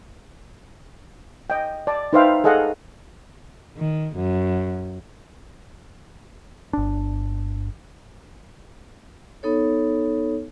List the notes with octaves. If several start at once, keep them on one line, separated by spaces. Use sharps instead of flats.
D#5 G5
D5 A5
D#4 B4 C5 E5 F5 G5
G#4 A4 D#5 F5 F#5
D#3
F#2
G1 D4
B3 D#4 A4 C#5